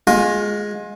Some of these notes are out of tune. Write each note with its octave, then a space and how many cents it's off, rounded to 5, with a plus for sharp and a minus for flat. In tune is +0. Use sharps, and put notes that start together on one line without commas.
G#3 +0 F4 +30